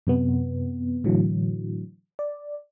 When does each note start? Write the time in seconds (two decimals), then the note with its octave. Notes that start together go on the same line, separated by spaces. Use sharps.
0.07 F#2 C3 B3
1.04 A2 D3 E3 F#3
2.19 D5